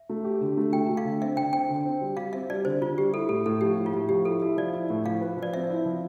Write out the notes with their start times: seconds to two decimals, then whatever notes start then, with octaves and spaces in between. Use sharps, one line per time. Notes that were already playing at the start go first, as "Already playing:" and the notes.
Already playing: E5
0.09 A3
0.25 G4
0.41 D3
0.57 A3
0.73 A3 G5
0.89 A3
0.97 F5
1.05 D3
1.21 C4 E5
1.37 D3 G5
1.53 C4 G5
1.69 D3
1.85 C4
2.01 G3
2.17 G3 F5
2.33 C4 E5
2.50 G3 D5
2.65 D3 C5
2.81 D3 F4
2.98 G3 G4
3.13 E4 A4
3.29 A2 A4
3.46 A2 A4
3.61 F3 G4
3.77 A2
3.86 F4
3.93 A2
4.09 F3 G4
4.25 E4 A4
4.42 E4
4.57 F3 D5
4.73 E4
4.90 A2
5.05 F3 F5
5.21 B4
5.37 F3
5.43 D5
5.54 C4 E5
5.69 E4
5.85 F3